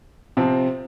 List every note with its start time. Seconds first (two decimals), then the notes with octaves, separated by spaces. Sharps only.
0.37 C3 F3 C4